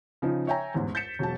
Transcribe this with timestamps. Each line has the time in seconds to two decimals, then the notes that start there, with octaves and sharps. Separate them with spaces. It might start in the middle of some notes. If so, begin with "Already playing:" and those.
0.22 C#3 F3 D#4
0.47 C#5 E5 G5 G#5 A#5
0.74 A1 E2 G#2
0.95 G6 A6 B6 C#7 E7
1.19 E1 F#3 A5